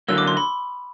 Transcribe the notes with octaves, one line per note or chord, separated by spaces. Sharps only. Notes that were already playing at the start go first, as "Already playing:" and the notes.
D3 F#3 A#3 E6
D6
C6
B5